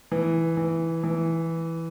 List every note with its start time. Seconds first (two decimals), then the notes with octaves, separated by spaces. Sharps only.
0.12 E3
0.57 E3
1.04 E3